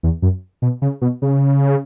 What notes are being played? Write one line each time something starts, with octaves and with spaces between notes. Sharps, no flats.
E2
F#2
B2
C#3
B2
C#3